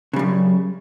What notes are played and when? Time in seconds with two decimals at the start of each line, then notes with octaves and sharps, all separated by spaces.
0.13 C#3
0.16 G3
0.19 F#2